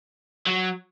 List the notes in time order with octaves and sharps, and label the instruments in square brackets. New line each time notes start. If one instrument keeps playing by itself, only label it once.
[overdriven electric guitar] F#3